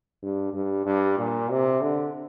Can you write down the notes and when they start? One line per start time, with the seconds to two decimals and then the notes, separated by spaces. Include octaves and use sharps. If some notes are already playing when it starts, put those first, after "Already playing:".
0.23 G2
0.54 G2
0.85 G2
1.18 A#2
1.49 C3
1.81 D3